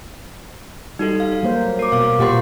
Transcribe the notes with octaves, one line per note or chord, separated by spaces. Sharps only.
G3 D#4 F#4 A4
F5
F#3 A#3 C5
A#4 D6
B2 F5 D6
A#2 A#3 G4 C5 F#5 C6